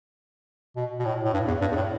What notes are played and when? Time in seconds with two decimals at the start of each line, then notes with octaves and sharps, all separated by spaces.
0.77 B2
1.00 B2
1.05 A2
1.25 A2
1.34 G2
1.48 E2
1.61 G2
1.72 E2
1.76 A2